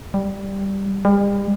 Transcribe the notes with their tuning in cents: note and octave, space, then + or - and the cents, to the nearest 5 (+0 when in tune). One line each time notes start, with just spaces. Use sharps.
G3 +0
G3 +40